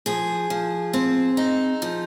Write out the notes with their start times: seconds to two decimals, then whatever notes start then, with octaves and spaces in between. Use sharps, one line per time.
0.06 F3 G#4
0.50 F3
0.93 C4
1.37 D#4
1.82 F3